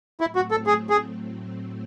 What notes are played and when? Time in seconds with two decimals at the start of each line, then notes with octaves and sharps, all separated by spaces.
0.21 A2 F#3 A3 C4 E4
0.36 F#4
0.51 A4
0.67 G#4
0.90 G#4